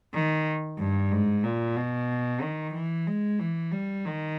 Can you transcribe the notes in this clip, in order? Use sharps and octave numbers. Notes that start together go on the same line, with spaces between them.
D#3
G2
G#2
A#2
B2
D#3
E3
G#3
E3
G3
D#3